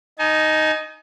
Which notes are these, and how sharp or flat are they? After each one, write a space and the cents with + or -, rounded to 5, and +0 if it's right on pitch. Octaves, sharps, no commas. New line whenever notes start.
D#4 +0 G#5 +40